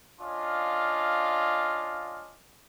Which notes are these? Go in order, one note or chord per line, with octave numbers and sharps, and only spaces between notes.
C#4 D4 F4 D#5 F5